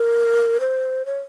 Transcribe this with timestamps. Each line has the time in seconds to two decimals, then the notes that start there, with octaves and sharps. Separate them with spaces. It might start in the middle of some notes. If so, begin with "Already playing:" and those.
Already playing: A#4
0.60 C5
1.06 C#5